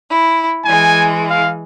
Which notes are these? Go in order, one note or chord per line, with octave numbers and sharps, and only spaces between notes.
E4
E3 G#3 G#5
F5